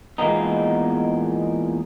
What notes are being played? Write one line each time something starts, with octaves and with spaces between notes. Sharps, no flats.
E2 A#2 G#3 A#3 B3 D#4